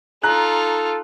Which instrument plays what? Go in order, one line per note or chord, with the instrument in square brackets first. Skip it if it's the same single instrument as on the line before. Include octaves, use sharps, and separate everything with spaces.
[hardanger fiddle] D#4 F4 [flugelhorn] A4 [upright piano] A#5 F#6